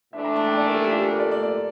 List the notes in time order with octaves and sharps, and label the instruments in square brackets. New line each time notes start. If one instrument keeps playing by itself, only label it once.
[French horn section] A2 E3 A3 D4 [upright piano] E5
[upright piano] A#5
A5
G5
D5
A#4
A4
G4
F4
A4
A#4
D5
D5
D5